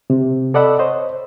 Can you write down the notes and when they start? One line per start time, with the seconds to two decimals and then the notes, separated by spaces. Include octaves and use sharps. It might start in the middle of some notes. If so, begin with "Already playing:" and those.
0.10 C3
0.54 A4 D5 D#5 F#5 B5 E6
0.79 C5 C#5 D#5